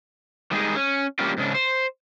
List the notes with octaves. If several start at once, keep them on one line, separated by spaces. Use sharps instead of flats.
D#3 G3 G#3 D4 D#4 G#4
C#4
G3 A#3 C#4 D4 F4 G4
G#2 C#3 D4
C5